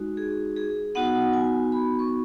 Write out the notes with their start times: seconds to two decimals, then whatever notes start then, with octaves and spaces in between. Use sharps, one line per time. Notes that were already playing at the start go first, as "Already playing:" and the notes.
Already playing: G#3 D#4 F#4
0.17 G#4
0.56 G#4
0.95 B3 D#4 F#4 F#5
1.34 G#5
1.72 B5
1.99 C#6